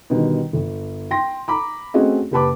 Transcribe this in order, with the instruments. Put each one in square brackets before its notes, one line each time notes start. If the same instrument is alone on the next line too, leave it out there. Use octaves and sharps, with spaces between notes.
[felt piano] B2 D3 D#3 G3
G1
G5 C6 A#6
A#5 B5 D6
A3 C4 C#4 F#4 G#4 D#5
F#1 G4 B4 A5 B5 D6